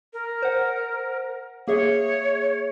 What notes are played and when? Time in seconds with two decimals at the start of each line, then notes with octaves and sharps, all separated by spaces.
0.13 A#4
0.42 C5 F#5
1.68 A#3 G#4 C#5 E5